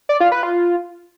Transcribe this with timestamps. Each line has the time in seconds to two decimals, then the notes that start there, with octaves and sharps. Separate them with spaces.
0.09 D5
0.20 F4
0.32 B4
0.43 F4